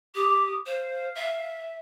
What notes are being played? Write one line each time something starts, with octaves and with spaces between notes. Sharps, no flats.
G4 D6 D#6
C5 F5
E5